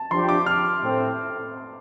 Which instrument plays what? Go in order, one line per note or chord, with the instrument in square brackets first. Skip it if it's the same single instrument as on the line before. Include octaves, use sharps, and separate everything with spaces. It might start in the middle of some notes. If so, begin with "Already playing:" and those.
Already playing: [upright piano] A5
[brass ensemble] F3 D4 G4 D5 [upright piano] C6
[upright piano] D6
F6
[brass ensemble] A2 A3 C4